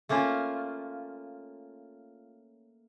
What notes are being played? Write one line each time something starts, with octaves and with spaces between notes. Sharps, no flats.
A3 A#3 C#4 F4